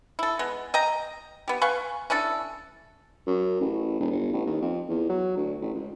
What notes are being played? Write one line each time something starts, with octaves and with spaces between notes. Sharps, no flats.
E4 A4
G#3 B3
D#5 G5 A#5
B3 G4
B4 F5 G#5 C#6
C#4 D4 E4 A4
F#2
A1
E1
G1
A1
D#2
F2
E2
F#3
D2
A1
C#2